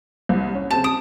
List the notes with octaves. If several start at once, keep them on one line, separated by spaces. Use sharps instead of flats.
C2
C#4
C#3 C4 A5 E7
D#6 D7